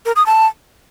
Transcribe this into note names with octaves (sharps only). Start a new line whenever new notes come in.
A#4
D#6
A5